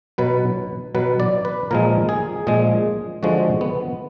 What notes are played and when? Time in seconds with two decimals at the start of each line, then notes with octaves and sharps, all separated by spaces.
0.18 B2 F#3 B4
0.95 B2 F#3 B4
1.20 D5
1.45 B4
1.71 A#2 F3 G#3 A#4
2.09 G#4
2.47 A#2 F3 G#3 G#4
3.23 D3 F3 G#3 F#4
3.61 B3